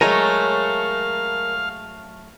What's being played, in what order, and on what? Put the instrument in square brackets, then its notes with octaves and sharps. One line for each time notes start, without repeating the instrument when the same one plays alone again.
[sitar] F#3 A3 [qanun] G#3 C#5 [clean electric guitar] A#4 G#5 A#5 [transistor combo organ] F5